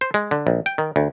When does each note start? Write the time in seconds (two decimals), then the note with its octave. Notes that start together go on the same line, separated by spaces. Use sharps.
0.01 C5
0.14 G#3
0.31 D3
0.47 A#1
0.66 G5
0.78 D#3
0.96 D2